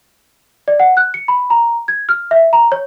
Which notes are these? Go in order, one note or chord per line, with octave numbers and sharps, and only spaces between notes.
D5
F#5
F#6
C#7
B5
A#5
G#6
F6
E5
A#5
C#5